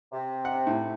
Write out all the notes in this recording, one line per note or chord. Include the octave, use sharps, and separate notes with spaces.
C3
F#5
A2